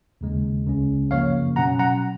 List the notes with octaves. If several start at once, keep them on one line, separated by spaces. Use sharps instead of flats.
D#2 C#3 G#3
C#2 C#3 G#3 C#4
F#2 C#3 F3 A#3 C#5 F5
B2 F#3 C#4 F#5 A#5
F#5 A#5